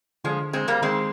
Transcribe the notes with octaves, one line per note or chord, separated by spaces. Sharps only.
D3 F3 G#3
G#3 C4
G3 A#3
D#3 G#3 C4